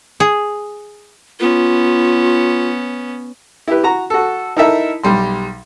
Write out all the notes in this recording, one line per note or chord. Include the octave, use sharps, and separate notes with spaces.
G#4
B3 C#4 F4
E4 G4 B4
F#4 A#5
F#4 A4
D#4 E4 A4 A#4 E5
B1 G3 C6